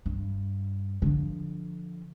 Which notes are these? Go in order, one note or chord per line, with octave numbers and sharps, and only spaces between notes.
G2
D3 F3